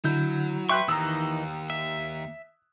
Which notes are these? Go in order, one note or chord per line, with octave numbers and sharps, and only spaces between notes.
D3 F#3 E4 G6
B4 E5 G5 C6 C#6 F#6
D#2 D#3 E3 D#4 A#5 D#6 E6
E5